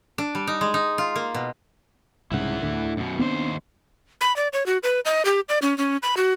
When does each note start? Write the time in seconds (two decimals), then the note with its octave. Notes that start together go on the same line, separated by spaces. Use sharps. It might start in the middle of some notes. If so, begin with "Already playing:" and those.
0.18 D4
0.35 G3
0.47 D#4
0.61 G#3
0.74 D#4
0.98 F4
1.16 A#3
1.34 B2
2.32 C2 G#2 C#3 E4 F#5
2.62 D2 A2 D3
2.97 F#2 B2
3.19 D#2 B3 C4 D4 C5
4.21 B5
4.36 D5
4.53 C#5
4.66 F#4
4.83 B4
5.05 D#5
5.25 G4
5.49 D5
5.62 C#4
5.78 C#4
6.03 B5
6.17 F#4